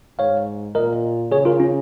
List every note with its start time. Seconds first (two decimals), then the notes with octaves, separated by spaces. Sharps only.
0.19 G#2 C#5 F5
0.75 A#2 A#4 D#5
1.32 C#3 G#4 C#5
1.45 F4 A#4
1.60 C#4 F4